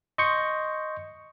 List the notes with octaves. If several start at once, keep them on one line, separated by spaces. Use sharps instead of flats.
D#5 C6 C#6 G6 C#7